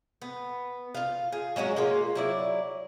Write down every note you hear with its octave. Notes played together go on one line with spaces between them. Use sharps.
B3
F4 F5
G#4
F#3 G#3 C#4 F#4
G#3 A#3 F4
F#3 E4 D5